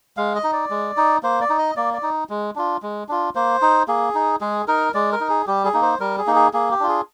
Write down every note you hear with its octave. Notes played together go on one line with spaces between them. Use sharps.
G#3 F5
D#5
D#4
D5
G#3
D#4
A#3 C5
D5
D#4
D#5
A#3 D5
D5
D#4
G#3
D4 F4
G#3
D4 F4
A#3 C5
D#4
A#3 G#4
D#4
G#3 G#4
D#4 A#4
G#3 D5
A#4
D#4
G#4
G3 G4
G#4
A#3 D#4
C5
G3 A#4
G#4
A#3 D#4
G#4
A#3 G#4
G4
D4 F4
G#4